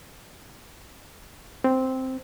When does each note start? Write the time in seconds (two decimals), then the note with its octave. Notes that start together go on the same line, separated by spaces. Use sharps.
1.64 C4